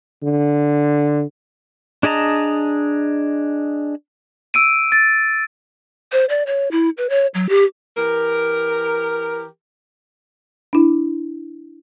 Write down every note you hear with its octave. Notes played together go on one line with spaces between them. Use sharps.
D3
D4 G#4 D#5 A5 A#5
E6 D7 D#7
A6
C5
D5
C#5
E4
B4
C#5
F#3
G4
E3 G4 A#4
D4 E4